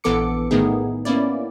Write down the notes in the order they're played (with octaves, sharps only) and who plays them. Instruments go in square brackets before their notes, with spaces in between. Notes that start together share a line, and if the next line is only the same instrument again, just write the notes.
[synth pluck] A#1 E3 B3 A4 D6 C#7
A2 D#3 A3 B3 D#4 G#4
A#3 B3 C#4 E4 D5